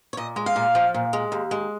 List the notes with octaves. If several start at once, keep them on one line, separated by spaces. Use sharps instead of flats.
C#5
A#2 D#5
G#3
F5
A#2
F3
A#2
G#3
D#2
G#3